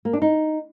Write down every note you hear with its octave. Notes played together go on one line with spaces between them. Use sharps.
A#3
D4
D#4